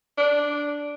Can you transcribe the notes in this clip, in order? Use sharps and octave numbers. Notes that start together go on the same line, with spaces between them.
D4